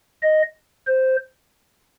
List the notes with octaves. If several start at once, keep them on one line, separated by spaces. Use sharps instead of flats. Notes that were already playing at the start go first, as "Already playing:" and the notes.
D#5
C5